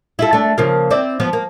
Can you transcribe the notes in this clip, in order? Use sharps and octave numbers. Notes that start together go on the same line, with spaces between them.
E4 F4 A4
A3 D4
C#3 F3 A#3
C4 E4 D5
F3 B3
A#3